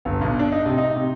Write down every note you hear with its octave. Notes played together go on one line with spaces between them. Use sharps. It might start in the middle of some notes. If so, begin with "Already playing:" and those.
G1
B1
D4
D#4
C3
D#4
C3